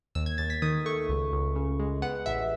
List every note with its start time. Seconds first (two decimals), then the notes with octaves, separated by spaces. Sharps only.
0.15 D#2 E6
0.26 G#6
0.38 D#2 A6
0.50 B6
0.62 D#3 D#6
0.85 A3 C#6
1.09 C#2
1.32 C#2
1.56 C#3
1.79 G#3
2.02 B3 F#5
2.26 A1 E5